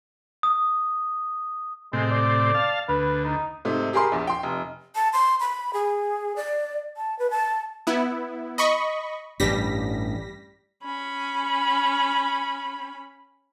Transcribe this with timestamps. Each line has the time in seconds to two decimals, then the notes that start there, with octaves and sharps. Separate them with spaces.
0.43 D#6
1.93 A2 C3 G#3 C4
2.11 D5
2.54 F5 A5
2.89 D2 B4
3.25 D#4
3.65 G#2 C3 A3
3.93 G4 G#4 A#4 B5 C6
4.12 A#1 E2
4.27 G5 C6
4.43 F1
4.95 A5
5.13 C6
5.40 B5
5.74 G#4
6.36 D5
6.97 A5
7.19 B4
7.30 A5
7.87 B3 E4
8.58 D#5 B5 C#6
9.40 A1 G2 G3 A#6 B6
10.85 C#4 B5